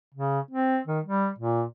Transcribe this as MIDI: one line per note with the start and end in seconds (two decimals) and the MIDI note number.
0.14 0.40 49
0.51 0.79 60
0.87 1.00 51
1.05 1.30 55
1.39 1.63 46